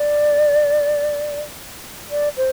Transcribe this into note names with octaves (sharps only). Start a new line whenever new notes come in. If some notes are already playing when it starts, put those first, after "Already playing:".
Already playing: D5
D5
C5